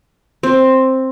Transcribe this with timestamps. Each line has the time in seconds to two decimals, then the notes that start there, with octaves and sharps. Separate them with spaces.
0.43 C4